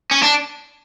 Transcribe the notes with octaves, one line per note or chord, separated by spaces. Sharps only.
C#4
D4